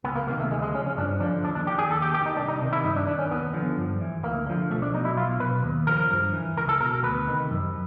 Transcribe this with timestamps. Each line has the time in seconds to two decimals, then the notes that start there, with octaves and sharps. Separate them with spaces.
0.04 C#2 B3
0.16 A#3
0.27 C3 D#3 A#3
0.40 A3
0.51 D2 G#3
0.62 G#3
0.74 C#3 C#4
0.78 F3
0.86 C#4
0.97 G2 D4
1.20 D3 F3 D4
1.44 D#2 D4
1.55 D4
1.67 D#3 G4
1.79 G#4
1.90 D#2 A4
2.02 G4
2.14 D#3 G4
2.26 D#4
2.37 C2 D4
2.48 D#4
2.61 C3 D#3
2.73 E4
2.84 G2 D#4
2.96 D4
3.07 D#3 D4
3.19 C#4
3.30 D#2 B3
3.53 D3 F3
3.77 G2
4.01 E3
4.23 D2 A#3
4.47 D3 F3
4.71 B1 A3
4.82 D4
4.94 B2 D#4
5.05 E4
5.17 B1 F4
5.40 B2 B4
5.63 D#2
5.87 C#3 F3 A#4
6.10 G2
6.33 E3
6.57 C#2 A#4
6.69 A4
6.80 B2 A#4
7.03 D2 B4
7.27 C3 D#3
7.50 F#2